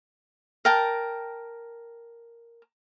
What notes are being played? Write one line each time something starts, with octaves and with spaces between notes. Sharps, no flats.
A#4 G5 A5